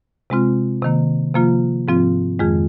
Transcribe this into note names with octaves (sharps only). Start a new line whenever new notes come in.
C3 G#3 C4 F4
C3 D#3 A#3
C3 F3 A#3 F4
G#2 F3 C4 F4
F2 D#3 G#3 F4 G#4